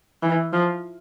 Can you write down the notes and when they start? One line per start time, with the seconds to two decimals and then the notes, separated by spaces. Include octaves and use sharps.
0.23 E3
0.53 F3